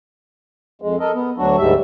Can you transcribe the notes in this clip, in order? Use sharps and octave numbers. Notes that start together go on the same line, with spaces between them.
F2 G#3
A4 A#4 D#5
B3
D2 F#3 D4 F#4
D2 G#2 G3 E5